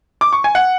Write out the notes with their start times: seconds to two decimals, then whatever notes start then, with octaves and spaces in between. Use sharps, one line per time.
0.21 D6
0.33 C#6
0.44 G#5
0.55 F#5